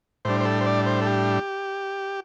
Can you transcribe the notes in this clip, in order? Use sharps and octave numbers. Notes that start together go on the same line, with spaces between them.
A2 G3 D4 C5
C5
A4
C5
D5
C5
A4
G4